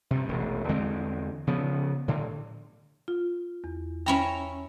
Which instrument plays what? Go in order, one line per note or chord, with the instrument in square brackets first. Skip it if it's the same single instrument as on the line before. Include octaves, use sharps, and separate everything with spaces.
[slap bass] G2 C3
E1 A1
E2 D3 G#3 C4
C#3 F3 B3
A2 D3
[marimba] F4
E2
[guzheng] C#4 E4 A#5 [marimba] G5